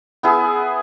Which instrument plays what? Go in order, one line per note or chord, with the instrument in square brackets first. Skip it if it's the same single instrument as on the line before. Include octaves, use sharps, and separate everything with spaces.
[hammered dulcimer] B3 E4 G#4